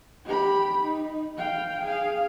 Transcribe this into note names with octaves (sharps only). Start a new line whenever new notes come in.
G4 B5
D#4
F5 G5
G#4 F5